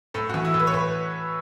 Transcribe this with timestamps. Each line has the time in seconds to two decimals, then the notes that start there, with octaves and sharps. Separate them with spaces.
0.14 A2 A4
0.29 F#4
0.34 E3
0.45 E4
0.54 A2
0.60 B4
0.67 C#5
0.73 A2 B4